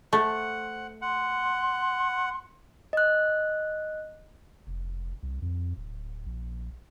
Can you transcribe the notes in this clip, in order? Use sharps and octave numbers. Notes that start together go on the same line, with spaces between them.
A3 C5 F#5
F#5 C6
D#5 F#6
F1
C2
F2
D1
A#1